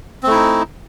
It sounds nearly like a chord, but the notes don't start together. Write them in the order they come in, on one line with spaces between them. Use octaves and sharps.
C4 A3 E4 D#4